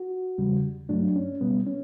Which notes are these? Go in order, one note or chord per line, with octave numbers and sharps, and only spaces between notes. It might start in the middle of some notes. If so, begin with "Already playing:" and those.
Already playing: F#4
E2 C#3 G3
G2 F#3 A3 D4
C#4
B2 G3 B3
C#4